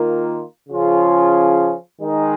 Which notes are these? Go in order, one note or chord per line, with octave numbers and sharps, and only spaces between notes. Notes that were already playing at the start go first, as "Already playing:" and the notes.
Already playing: D#3 A#3 F4 A#4
C#3 F3 C#4 F4 G#4
D#3 G#3 D#4 A#4